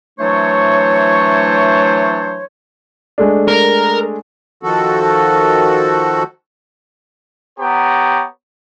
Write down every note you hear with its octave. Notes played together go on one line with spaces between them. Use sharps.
E3 F#3 A3 D4 C5 C#5
G#3 A3 D4
A#4
D#3 F3 F#4 A4
B3 G4 C#5 A5 A#5